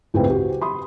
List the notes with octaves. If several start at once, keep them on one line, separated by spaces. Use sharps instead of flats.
C#2 A2 C4 G#4 B4 G5
F#4 G4
B5 C6 D#6